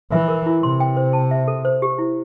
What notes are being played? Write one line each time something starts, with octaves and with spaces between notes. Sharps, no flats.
E3 E5
A#4
E4
C3 C6
G5
C5
A5
E5
A4
C5
G4
E4